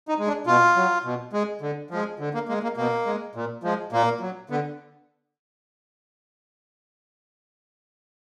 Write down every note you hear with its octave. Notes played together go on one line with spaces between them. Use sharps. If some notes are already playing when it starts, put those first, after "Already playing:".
D#4
G#3
D4
B2 F4
F#3
B2
G#3
D3
F3 G#3
D3
A#3
G#3 A#3
A#3
B2 A#3
G#3
A#2
F3 G#3
A#2 A#3
F#3
D3 B3